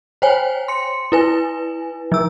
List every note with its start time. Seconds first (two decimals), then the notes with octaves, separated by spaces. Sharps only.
0.22 C5 C#5 G5 G#5
0.68 C6 C#7
1.12 E4 B4 G#5
2.12 F3 E6